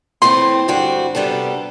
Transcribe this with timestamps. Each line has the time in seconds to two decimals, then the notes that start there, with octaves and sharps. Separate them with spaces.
0.22 A2 E3 A3 C4 C6
0.68 G2 D3 G3 C4 F#4
1.15 C3 G3 B3 D4 A4